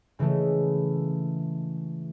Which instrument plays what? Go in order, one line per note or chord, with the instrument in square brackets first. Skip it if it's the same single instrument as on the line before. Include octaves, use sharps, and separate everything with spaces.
[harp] C#3 E3 G#3 A3